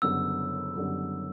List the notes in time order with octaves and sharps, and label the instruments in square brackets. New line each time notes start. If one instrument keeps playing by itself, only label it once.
[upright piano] F#1 F#2 D3 G3 B3 [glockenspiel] E6
[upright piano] F#1 F#2 D3 G3 B3